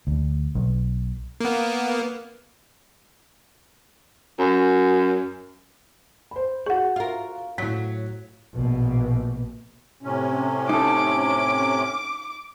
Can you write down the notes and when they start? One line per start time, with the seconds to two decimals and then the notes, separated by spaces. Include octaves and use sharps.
0.07 D2
0.55 B1
1.40 A#3 B3
4.39 F#2
6.31 C5 B5
6.66 F#4 G#4 F#5 C#6
6.96 F4 A#4
7.58 A2 F#3 B6
8.55 A#1 B2
10.03 A2 C3 C#4
10.69 D#4 A4 D6